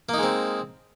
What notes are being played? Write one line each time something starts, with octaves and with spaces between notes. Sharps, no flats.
G#3 A#3 C4 D#4